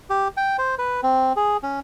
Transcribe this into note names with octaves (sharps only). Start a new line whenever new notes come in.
G4
G5
C5
B4
C4
G#4
C#4